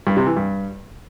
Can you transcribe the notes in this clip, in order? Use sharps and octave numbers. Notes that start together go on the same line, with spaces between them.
G2
C3
E3
G2